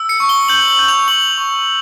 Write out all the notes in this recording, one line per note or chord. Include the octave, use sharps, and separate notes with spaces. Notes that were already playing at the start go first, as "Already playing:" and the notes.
Already playing: E6
C#7
C#6
G7
G6 F#7
F#7
G6
F7
C#6 F#7
C#6